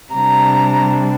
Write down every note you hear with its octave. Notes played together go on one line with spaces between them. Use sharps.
C3 G3 D4 A#5